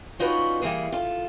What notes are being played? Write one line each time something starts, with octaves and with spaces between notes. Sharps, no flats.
C#4 D#4 F4 F#4 B4 D5
E3 G3 A#3 G#4
F4 A4